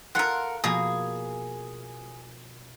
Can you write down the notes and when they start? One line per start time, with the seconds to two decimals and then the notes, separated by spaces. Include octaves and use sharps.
0.15 F4 A4 A#4 C5 F#5
0.64 B2 F3 A#3 G#4